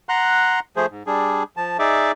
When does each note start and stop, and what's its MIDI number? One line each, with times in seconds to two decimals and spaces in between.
0.09 0.60 78
0.09 0.60 82
0.09 0.60 84
0.09 0.60 90
0.77 0.86 53
0.77 0.86 57
0.77 0.86 68
0.77 0.86 72
0.91 1.03 44
1.07 1.43 55
1.07 1.43 62
1.07 1.43 68
1.57 1.77 53
1.57 1.77 81
1.79 2.12 63
1.79 2.12 68
1.79 2.12 74
1.79 2.12 76
1.79 2.12 86